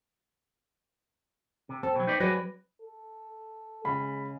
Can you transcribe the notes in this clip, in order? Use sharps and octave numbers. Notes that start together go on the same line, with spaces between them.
C3
C4 A4
B2 F#3
D#4 B4 D5
F#3 F#4 G#4 B4 D5
A4
C#3 G#3 B5